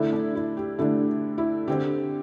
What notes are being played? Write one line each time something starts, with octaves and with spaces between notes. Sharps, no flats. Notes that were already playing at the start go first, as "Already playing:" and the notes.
Already playing: D3 A3 D4 E4
D4
E4
G4
D3 A3 D4 E4
E4
D3 C4 G4